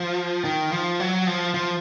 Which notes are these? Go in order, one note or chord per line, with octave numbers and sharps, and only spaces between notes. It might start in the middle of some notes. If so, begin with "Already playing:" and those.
Already playing: F3
D#3
F3
F#3
F3
F3